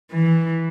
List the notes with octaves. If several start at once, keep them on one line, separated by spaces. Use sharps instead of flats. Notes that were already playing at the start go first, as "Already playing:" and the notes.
E3